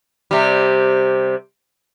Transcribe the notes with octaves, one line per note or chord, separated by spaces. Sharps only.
C3 G3